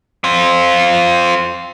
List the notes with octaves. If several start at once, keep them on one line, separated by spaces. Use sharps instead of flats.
C4 F4